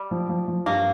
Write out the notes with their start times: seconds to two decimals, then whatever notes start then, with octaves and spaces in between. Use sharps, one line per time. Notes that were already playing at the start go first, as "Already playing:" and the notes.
Already playing: G3
0.11 F3
0.29 F3
0.48 F3
0.66 G2 A#3